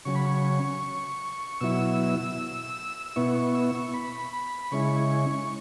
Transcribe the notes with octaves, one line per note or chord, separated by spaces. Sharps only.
C#3 F#3 C#4 C#6
B5
C#6
B2 F#3 E4 E6
E6
B2 B3 E4 C#6
C#6
E6
C#6
B5
B5
C#3 G#3 C#4 E4 C#6